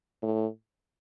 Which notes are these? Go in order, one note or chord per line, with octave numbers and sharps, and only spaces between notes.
A2